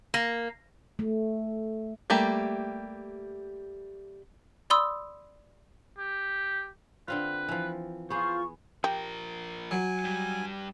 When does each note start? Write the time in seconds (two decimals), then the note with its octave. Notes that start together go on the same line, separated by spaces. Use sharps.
0.14 A#3
0.99 A3
2.10 G3 A3 A#3 G4
4.70 D5 B5 C6 D#6 E6
5.98 G4
7.08 D3 C4 F4 B4
7.49 E3 F3
8.10 B3 F4 G#4 C5 C#6
8.84 F3 G4 A#4
9.71 F#3 G#5
10.04 G2 G3